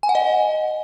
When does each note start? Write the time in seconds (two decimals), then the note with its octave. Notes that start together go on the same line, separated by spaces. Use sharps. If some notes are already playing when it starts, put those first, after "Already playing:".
0.03 G#5
0.09 F#5
0.15 D#5